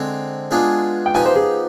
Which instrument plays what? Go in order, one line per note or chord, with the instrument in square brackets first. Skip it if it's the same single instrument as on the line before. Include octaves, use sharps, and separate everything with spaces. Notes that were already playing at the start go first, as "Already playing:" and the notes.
Already playing: [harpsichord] D3 G#3 C4
G#3 B3 D4 F4 G#4
[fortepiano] G5
[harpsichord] F3 B3 D#4 G4 [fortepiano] G#5
[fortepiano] C5
G#4